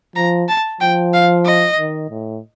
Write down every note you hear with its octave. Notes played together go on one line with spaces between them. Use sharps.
F3 A#5
A5
F3 G5
F5
D#5
D#3
A2